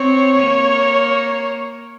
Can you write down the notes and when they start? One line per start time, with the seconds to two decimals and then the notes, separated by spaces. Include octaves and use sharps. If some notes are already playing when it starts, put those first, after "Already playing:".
Already playing: C4 C#5
0.39 A#3